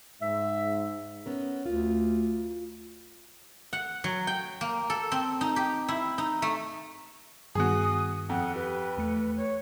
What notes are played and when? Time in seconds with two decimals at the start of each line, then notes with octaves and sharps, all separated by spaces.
0.22 G#2 E5
1.26 B3 C#4 A#4
1.66 D2 F4
3.73 F#5
4.04 F#3
4.27 G5
4.61 A#3
4.90 A4
5.12 C4
5.41 D#4
5.56 G4
5.88 E4
6.18 D#4
6.42 A3
7.55 G2 D#3 B3 F#4 G#4 D#6
8.29 F2 F#5
8.56 G4 B4
8.97 E2 A3 C#7
9.37 C#5